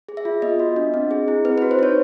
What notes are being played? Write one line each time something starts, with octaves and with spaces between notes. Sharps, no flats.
G#4
E5
F4
B3 D#5
F#4
D4
C4
G#4
E4
C4 B4
F#4 B4
C5
D#4 C#5